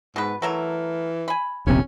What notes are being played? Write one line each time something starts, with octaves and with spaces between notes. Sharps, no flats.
G#2 B2 B4
E3 F#3 A3 A#4
G#5 B5
D#1 A#1 C3 C#4